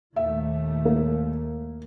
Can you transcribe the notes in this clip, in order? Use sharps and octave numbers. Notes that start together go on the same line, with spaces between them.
D#2 A#2 A3 E5
A#3